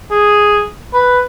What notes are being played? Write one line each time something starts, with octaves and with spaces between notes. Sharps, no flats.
G#4
B4